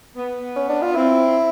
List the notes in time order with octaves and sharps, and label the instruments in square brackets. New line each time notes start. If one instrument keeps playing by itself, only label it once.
[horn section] B3
[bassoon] C#4
D4
F4
[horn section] C4 [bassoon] E4